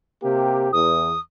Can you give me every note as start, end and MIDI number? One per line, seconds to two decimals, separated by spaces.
0.23 0.72 48
0.23 0.72 58
0.23 0.72 67
0.72 1.12 40
0.72 1.20 87